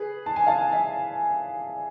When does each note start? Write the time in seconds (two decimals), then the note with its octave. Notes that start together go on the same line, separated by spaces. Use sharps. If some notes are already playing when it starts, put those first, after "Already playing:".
Already playing: G#4 B4
0.26 A5
0.36 G#5
0.47 F5 A5
0.72 E5 G#5